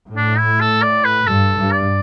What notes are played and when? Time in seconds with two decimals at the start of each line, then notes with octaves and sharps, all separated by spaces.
0.09 A2
0.16 D4
0.38 E4
0.60 A4
0.82 D5
1.04 B4
1.27 G2 A4
1.56 G2
1.71 D5